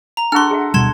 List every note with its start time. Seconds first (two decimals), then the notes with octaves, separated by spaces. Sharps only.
0.17 A#5
0.32 D4 F#4 A4 C6 F6
0.51 G#4 E5 F#5
0.74 D1 B2 G3 C6 G#6 E7